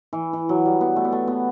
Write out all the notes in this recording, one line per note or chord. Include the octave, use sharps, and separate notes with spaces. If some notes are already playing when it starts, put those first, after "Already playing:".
E3
E3
F#3
G3
B3
A3
B3
A3
B3